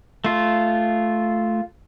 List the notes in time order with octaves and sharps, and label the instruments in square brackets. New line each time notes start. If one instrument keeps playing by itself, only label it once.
[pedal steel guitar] A3 F4